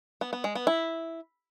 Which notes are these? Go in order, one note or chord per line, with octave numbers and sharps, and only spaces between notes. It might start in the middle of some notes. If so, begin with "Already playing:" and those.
B3
B3
G#3
B3
E4